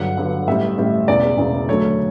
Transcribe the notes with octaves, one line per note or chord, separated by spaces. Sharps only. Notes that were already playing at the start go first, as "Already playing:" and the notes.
Already playing: G1 G2 D3 F#3 F#5
G1 G2 D3 F#3
A1 A2 G3 E5
A1 A2 G3
E1 E2 C#3 D5
E1 E2 C#3
D2 D3 F#3 A3 C#5